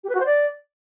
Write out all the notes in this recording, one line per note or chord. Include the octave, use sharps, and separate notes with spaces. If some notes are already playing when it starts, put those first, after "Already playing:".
G4
B4
F#4
C5
D5